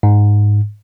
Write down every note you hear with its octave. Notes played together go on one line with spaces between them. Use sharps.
G#2